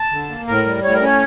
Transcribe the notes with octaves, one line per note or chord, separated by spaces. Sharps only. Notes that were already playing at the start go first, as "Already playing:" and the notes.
Already playing: A5
D3
A#3
A2 A#4
G3
A2 C#5
A#4
C#4 C#5